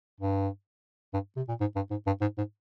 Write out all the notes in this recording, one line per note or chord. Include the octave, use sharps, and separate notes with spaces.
G2
G2
C3
A#2
G#2
G2
G#2
G2
G#2
G#2